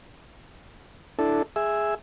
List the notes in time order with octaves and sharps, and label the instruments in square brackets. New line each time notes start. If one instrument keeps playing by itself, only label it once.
[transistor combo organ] D4 E4 A4
G#4 E5